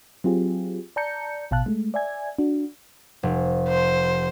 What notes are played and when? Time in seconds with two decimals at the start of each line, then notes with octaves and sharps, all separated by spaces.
0.24 F#3 C4 F4 G4 G#4
0.96 D5 A5 A#5 G6 C#7
1.51 A1 B2 F5 A5 F#6
1.66 G#3 A3
1.94 D5 E5 G#5 G#6
2.38 D4 F#4
3.23 F1
3.69 C5